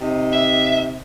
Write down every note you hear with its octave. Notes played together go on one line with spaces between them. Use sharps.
C3 D#4
E5